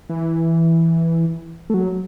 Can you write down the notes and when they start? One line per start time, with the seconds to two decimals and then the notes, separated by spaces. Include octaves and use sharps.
0.10 E3
1.70 A3
1.74 F#3